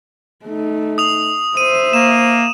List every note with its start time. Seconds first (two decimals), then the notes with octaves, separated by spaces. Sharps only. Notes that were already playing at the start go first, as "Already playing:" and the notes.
0.45 A3 D#4
0.98 D#6 F7
1.57 C5 E5 D#7
1.93 A#3 E7